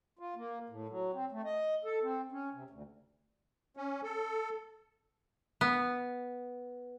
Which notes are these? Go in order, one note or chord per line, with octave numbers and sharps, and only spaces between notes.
F4
A#3
A2
F#3
C4
A3
D#5
A4
C4
C#4
C3
D2
C#4
A4
B3